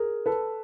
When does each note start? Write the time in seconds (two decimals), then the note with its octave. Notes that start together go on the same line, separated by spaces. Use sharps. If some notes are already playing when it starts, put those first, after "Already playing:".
Already playing: G#4 A#4
0.26 A4 B4